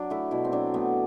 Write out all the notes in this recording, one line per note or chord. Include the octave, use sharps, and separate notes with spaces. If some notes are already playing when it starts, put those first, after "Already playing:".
Already playing: F#3 D4
A3 E4
B2 E4
C4
F#3 D4
A3 B3